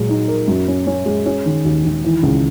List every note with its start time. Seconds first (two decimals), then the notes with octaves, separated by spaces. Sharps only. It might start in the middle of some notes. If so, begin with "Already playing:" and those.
Already playing: A#2 F#3 G#3
0.09 D#4
0.28 A#4
0.48 F#2
0.68 C#4
0.87 C#4
1.06 G#3
1.26 C#4
1.46 D#3
1.65 D#2
1.85 D#3
2.04 E3
2.23 C#2